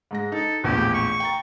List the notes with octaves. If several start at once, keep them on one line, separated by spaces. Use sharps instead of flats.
G#2 G#3 A#6
D#4 A4
A#1 E2 A2 G4
C#6
G5 A#5 A6